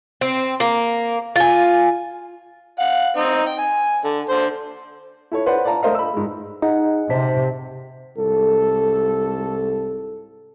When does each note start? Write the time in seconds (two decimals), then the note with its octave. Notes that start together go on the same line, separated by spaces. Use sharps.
0.21 C4
0.60 A#3
1.36 F4 G#5
2.80 F5 F#5
3.17 C4 D#4
3.46 G5
3.58 G#5
4.05 D3
4.29 D3 C5
5.32 E4 A4 C#5
5.46 B4 C5 D5 F#5
5.65 D5 F5 A5 A#5
5.83 A3 A#4 C5 D#5 F5
5.95 B5 E6
6.14 G#2 G#3
6.62 D#4 G#4 F#5
7.10 C3 C5 A5 B6
8.17 C2 G#2 A4